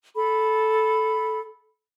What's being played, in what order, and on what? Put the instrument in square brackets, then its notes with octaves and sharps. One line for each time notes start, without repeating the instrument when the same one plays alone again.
[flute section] A4 B5